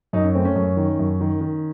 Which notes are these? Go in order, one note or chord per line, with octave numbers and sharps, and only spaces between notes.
F#2 D#4
C#4
A3 C4
C#4
F#2
D#3
F#2
D#3
D#3